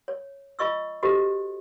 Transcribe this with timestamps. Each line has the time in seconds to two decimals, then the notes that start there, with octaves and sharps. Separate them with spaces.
0.08 C#5
0.59 F4 D#5 C#6 E6
1.03 F#4 G4 A4 C5 D#5